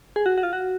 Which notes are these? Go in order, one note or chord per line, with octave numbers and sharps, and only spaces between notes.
G#4
F#4
F#4
F4
F#4